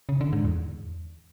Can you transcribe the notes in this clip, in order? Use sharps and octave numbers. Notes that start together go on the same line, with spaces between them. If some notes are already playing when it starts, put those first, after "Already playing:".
C#3
D3
G#2
E2